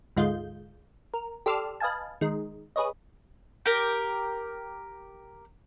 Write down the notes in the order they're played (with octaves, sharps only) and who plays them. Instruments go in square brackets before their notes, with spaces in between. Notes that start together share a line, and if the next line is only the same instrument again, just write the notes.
[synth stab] D2 G#2 G#3 F4 G6
A#4
G4 A4 D5 C6 E6 F6
B4 D#5 F5 G#5 A5
D#3 G#3
G#4 B4 C#5 D#5
[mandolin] G4 A#4